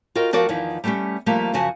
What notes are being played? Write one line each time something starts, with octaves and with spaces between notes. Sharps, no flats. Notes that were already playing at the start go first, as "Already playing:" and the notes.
F4 F#4 A#4 D#5 G5
F3 F#4 A#4 D5 F5 G5
E2 D#3 F3 D#4 E4
G3 A3 B3 C#4 G4
F3 G3 A3 A#3 F4 G4
F#2 C#3 F3 F#4 G#5 A5